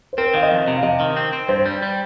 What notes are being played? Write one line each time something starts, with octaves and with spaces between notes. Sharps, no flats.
C5
C4 A#4
C5
D#3 F5
D#5
F2
C3
F5
C3 D#5
D#3
C4
C4
G2 C5
G3
G3